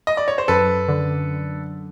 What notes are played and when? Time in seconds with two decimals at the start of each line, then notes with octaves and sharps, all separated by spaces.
0.07 D#5
0.17 D5
0.28 C#5
0.38 C5
0.48 F#2 A4 B4
0.88 D3